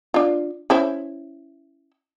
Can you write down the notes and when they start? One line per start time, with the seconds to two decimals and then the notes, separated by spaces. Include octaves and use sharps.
0.14 D4 F4
0.70 C#4 E4 C5